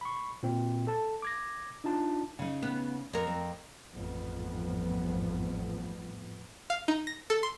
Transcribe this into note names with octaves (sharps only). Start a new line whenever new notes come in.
B5 C#6
A#2 C4
A4 A5
D6 G#6 A#6
D4 D#4 F4 A5
C#3 D#4
B3
F2 A#4
C4
A1 F2 G#2 F3 G3 B3
F5
D#4
A#6
A4
C6